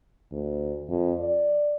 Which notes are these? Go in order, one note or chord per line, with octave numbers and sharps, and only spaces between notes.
D2
F2
D5